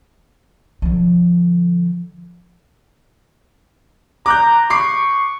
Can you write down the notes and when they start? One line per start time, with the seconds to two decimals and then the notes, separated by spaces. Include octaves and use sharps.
0.82 D3 F3
4.26 A#5 D6 F#6 G6
4.70 B5 C#6 D6 C7